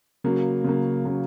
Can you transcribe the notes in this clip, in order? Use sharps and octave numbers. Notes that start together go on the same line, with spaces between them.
C#3 F#3 A#3
C#3 F#3 A#3
C#3 F#3 A#3